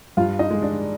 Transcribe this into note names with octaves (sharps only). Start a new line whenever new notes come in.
G2 F4 F5
D#4 D#5
G#3
D4 D5